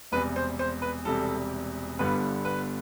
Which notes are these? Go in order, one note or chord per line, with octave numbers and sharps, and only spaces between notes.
E1 E2 C3 G3 B4
C5
C5
B4
E1 E2 C3 G3 A4
G1 G2 D3 G3 B3 B4
B4